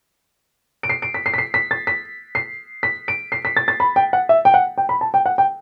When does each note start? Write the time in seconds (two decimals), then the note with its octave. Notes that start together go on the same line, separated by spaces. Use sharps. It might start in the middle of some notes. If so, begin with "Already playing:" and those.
0.83 D7
0.89 C7
1.02 D7
1.14 B6
1.26 C7
1.34 B6
1.38 C7
1.54 B6
1.71 A6
1.87 B6
2.35 C7
2.83 B6
3.08 D7
3.32 C7
3.45 B6
3.57 A6
3.68 A6
3.80 B5
3.96 G5
4.13 F#5
4.29 E5
4.45 G5
4.54 F#5
4.78 G5
4.89 B5
5.01 A5
5.14 G5
5.26 F#5
5.38 G5